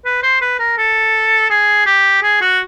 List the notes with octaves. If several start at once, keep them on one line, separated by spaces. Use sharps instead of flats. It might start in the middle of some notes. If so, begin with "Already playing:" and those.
B4
C5
B4
A#4
A4
G#4
G4
G#4
F#4